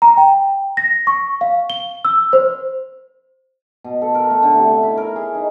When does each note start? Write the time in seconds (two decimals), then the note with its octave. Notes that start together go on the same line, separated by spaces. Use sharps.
0.02 A#5
0.17 G5
0.77 A#6
1.07 C#6
1.41 F5
1.70 G7
2.05 E6
2.33 C5
3.84 B2
4.02 A4
4.15 A#4
4.30 A3
4.43 D3
4.55 C3
4.69 C#5
4.83 E4
4.97 A#4
5.16 G#4
5.35 D#4